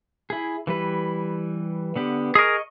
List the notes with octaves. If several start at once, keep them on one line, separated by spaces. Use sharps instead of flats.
E4 G#4
E3 G3 B4
D3 B3 G4
G#4 A#4 D#5 C#6